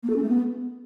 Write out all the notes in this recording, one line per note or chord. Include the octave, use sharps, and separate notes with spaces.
A#3
A4
C#4
A3
B3